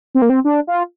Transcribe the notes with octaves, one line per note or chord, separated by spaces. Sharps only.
C4
A#3
C4
D4
F4